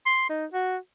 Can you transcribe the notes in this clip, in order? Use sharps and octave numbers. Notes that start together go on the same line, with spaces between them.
C6
D#4
F#4